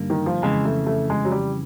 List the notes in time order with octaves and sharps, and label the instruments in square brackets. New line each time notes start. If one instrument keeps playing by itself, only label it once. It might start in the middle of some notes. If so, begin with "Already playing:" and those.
Already playing: [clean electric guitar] G2 D3 G3 A#3 D#4
[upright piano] D#3
F3
[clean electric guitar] F2 C#3 E3 [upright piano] G#3
[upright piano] A3
A3
G#3
F#3
G3